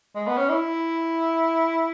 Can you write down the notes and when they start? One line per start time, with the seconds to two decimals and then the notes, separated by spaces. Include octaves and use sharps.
0.15 G#3
0.27 B3
0.38 C#4
0.49 E4